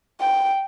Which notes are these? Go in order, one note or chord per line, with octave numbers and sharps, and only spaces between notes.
G5